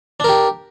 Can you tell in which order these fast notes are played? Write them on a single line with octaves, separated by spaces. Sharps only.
D4 A#4 G4